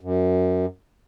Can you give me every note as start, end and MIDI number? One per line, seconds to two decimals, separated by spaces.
0.01 0.66 42